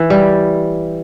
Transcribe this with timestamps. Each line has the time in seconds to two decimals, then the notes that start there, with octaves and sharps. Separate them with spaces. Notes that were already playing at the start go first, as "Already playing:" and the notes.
Already playing: E3
0.10 G3